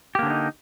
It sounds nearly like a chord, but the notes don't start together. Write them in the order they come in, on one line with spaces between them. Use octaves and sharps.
G4 A#3 D3 C#4 D#4